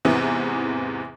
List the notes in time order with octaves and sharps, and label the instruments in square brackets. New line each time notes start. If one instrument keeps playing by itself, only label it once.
[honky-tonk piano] E2 G#2 C3 E3 B3